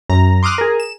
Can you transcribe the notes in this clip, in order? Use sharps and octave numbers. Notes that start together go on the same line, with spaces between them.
F#2 A#5
C6 D6 D#6 F6 F#6
G#4 A#4
E7